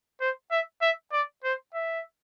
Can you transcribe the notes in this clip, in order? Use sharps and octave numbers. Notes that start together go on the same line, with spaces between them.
C5
E5
E5
D5
C5
E5